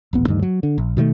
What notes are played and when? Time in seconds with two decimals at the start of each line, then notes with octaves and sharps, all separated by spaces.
0.13 D#1 A1 B3
0.26 D2 G2 D#3
0.42 F#3
0.63 D3
0.78 A#1
0.97 B2 D#3 E3 A3